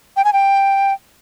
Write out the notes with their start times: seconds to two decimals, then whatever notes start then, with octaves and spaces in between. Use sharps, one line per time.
0.16 G5
0.25 G#5
0.33 G5